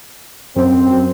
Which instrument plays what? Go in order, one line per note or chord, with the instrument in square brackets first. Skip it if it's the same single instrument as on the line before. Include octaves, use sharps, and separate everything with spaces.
[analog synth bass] F#2 [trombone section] C4